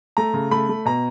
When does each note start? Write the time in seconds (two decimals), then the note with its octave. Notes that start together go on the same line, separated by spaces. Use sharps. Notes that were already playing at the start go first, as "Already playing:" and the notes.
0.17 A3 A#5
0.34 C#3
0.51 A3 B5
0.69 A3
0.85 B2 A#5